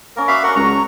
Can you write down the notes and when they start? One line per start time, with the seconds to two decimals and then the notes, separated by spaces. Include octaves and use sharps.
0.16 A#3 C#4 A#4 D6
0.28 F#4 D5 E5 F5 B5
0.44 C#4 A4 A#4 F#5 C#6
0.56 C#2 F#3 A#5 C#6